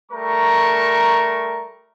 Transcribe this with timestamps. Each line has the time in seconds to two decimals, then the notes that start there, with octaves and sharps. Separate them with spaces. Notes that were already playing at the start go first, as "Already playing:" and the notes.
0.11 G3 A3 A#4 A#5 C#6